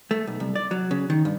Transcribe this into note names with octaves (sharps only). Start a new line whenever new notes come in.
A3
B1
C2
D5
F#3
C#3
D#3
G2